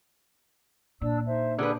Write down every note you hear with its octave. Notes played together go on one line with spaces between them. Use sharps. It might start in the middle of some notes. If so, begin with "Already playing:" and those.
A#2 D4 D5 E6
D#4 C5 E5
D3 D4 G4 G#4 B4